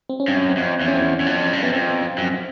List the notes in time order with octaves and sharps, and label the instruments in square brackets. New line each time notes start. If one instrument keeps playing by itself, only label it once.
[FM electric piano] C4
C#4
[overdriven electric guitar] G2
F#2
[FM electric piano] C4
[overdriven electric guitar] F2
E2
[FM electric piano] C#4
C4
C#4
[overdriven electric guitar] E2
F2
G2
[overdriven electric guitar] F#2 [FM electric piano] B3
[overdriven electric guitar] F2 [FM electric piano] C4
[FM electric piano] C4
[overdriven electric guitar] F#2
[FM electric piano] C4